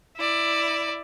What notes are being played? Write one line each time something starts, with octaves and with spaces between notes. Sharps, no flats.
E4 D5